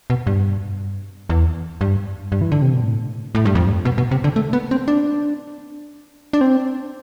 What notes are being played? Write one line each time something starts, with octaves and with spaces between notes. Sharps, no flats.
B2
G2
E2
G2
G2
E3
D3
C3
B2
A2
A2
G2
F2
G2
B2
B2
C3
D3
A3
B3
C4
D4
D4
C4